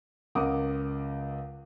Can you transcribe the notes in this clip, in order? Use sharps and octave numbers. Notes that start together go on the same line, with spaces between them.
C#2 A#4 F#5 D6 D#6